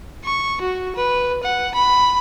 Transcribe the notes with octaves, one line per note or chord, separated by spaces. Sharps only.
C#6
F#4
B4
F#5
B5